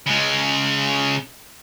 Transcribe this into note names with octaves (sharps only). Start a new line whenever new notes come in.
C#3 G#3